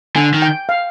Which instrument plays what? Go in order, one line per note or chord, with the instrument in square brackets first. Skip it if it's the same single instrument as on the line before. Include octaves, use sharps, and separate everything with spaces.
[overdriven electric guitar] D3 [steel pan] G#5
[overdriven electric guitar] D#3
[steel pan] G5
F5